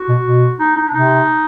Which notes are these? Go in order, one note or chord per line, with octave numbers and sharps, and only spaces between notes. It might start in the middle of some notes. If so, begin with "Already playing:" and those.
Already playing: F#4
B2
B2
D#4
D#4
D4
C3 D#4